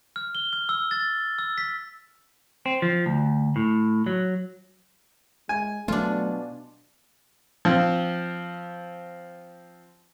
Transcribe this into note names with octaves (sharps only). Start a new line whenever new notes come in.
F6
G7
F6
E6
A6
E6
B6
C4
F3
D2
A2
F#3
G#3 G#5
B2 F#3 A3 D4 F4
F3 C4